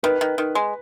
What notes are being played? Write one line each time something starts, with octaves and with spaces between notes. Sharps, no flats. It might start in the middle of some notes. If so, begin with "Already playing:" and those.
D#3 B4
D#3
D#3
G#3